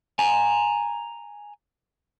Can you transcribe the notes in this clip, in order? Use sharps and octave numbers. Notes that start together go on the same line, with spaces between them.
G#5 A#5